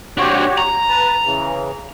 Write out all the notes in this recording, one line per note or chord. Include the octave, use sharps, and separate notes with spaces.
C4 D4 F#4 G4 C#5
A#5
B4 A5
C#3 E3